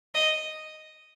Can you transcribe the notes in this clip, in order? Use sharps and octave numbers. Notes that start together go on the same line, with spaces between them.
D#5